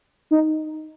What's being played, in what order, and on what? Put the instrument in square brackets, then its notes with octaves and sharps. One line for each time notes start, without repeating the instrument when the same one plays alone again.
[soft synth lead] D#4